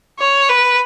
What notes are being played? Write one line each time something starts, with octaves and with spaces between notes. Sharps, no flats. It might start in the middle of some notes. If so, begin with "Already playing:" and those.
C#5
B4